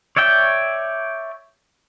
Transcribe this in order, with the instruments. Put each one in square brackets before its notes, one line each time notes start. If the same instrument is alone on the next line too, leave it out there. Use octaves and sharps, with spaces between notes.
[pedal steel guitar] C#5 D5 E5 G5